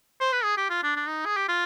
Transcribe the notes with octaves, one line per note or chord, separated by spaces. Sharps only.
C5
B4
G#4
G4
F4
D4
D4
D#4
G#4
G4
F4